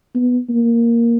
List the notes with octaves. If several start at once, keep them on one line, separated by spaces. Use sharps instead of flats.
B3
A#3